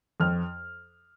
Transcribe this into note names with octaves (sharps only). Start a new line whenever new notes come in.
F2 F6